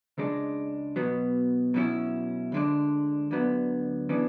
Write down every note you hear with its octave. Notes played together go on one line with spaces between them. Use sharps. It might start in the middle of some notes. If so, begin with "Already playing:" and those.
C#2 C#3 G#3 D4
B1 B2 F#3 B3
B2 F#3 C#4 E4
D2 D3 G#3 D4
D2 D3 F#3 B3
C#3 E3 B3 D4